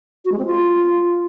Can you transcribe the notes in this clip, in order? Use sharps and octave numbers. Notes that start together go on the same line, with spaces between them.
F#4
G#3
C4
F4